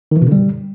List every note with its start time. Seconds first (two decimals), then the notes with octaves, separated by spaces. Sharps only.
0.11 D#3
0.17 E3
0.22 B2
0.27 D3
0.32 G3